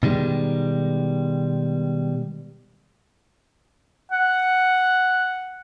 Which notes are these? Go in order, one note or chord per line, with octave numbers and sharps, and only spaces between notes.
B2 D#3 G3 G#3
F#5